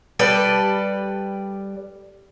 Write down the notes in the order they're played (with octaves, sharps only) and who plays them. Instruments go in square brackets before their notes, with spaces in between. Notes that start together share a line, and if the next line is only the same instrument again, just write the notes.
[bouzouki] G3 A4 B4 D5